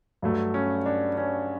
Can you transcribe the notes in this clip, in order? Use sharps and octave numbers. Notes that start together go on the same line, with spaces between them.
G2 F#3 A3
C#4
D4
C#4